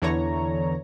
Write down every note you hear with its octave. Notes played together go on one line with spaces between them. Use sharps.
E2 D3 E3 C#5 A#5